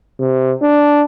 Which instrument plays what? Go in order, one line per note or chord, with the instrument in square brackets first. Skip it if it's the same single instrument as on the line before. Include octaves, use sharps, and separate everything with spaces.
[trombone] C3
D4